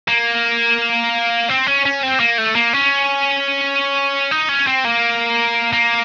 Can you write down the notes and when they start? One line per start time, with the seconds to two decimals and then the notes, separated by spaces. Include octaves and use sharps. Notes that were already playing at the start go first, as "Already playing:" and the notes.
0.08 A#3
1.49 C4
1.66 C#4
1.85 C#4
2.03 C4
2.20 A#3
2.38 A3
2.55 A#3
2.73 C#4
4.31 D#4
4.49 C#4
4.67 C4
4.85 A#3
5.73 A#3